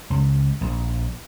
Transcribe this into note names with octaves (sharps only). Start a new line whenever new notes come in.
C#2
A#1